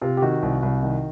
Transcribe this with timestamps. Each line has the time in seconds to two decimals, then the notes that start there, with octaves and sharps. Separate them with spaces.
0.01 C3 F4
0.17 G4
0.22 D#3 F#4
0.43 C2
0.63 C2
0.83 D#3